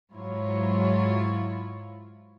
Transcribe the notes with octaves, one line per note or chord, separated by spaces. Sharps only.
G#2 F#3 E4 F4 C#5